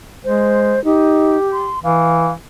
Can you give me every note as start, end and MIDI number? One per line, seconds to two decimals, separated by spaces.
0.24 0.77 56
0.24 0.82 72
0.84 1.37 63
0.84 1.72 67
1.52 1.79 84
1.84 2.32 52
1.84 2.32 77